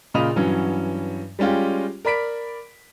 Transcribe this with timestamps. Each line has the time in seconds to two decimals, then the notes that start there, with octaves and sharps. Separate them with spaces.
0.14 A#2 C#3 D#5 B5 D#6 F7
0.36 G2 E3 F#3 C#4
1.39 G3 G#3 C#4 F4 G4
2.05 A#4 D5 B5 B6 D7